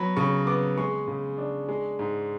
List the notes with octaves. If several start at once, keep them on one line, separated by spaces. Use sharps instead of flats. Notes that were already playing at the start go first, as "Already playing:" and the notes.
Already playing: F#3 B3 B5
C#3 C#6
B3 D6
G#3 C#6
C#3
D4
G#3
G#2